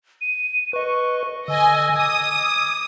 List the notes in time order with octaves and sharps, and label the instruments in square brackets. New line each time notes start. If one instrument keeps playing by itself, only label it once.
[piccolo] D#7
[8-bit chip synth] B4 D#5 [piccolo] C#6
[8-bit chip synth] D3 [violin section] D#5 G#5 [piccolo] E6
[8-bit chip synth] D6 G#6 [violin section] D#6